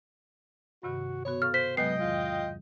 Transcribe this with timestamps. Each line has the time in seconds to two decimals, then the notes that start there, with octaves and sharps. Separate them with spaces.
0.83 G2 C3 D#3 F#4
1.25 B2 B3 F#4 C#5
1.42 A4 F5 C#6 F6
1.54 C5 B6
1.77 C3 F#3 G#3 B3 D#5 G5 C7
2.00 E2 G#2 D#3 F4